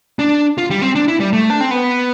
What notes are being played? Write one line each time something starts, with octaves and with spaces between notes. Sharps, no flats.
D4
F4
G3
C4
D4
E4
G3
A3
D4
C4
B3